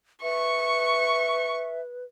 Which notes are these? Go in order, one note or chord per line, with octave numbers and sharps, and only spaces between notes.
B4 E5 C#6